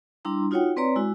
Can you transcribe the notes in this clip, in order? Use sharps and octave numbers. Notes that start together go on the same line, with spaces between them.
G3 D4 E4 A#5 C6
D#4 F4 F#4 C#5 F#5 G5
C4 B4 C#5 D5 A#5 C6
G#3 E4 F#4